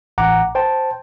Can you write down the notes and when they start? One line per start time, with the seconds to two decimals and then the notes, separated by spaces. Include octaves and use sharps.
0.18 A1 F#5 A#5 D6
0.55 C5 G5 A5